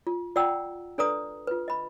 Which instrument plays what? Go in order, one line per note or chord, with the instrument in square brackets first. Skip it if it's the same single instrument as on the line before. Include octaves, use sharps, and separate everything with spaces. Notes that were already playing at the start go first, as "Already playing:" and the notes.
[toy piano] F4
F4 D5 F#5 G5 A#5 E6
D4 A4 B4 D5 A#5 D#6
F4 B4
D#5 B5